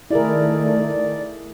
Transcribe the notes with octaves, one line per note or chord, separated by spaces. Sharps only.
D#3 A3 E4 G#4 A#4 D5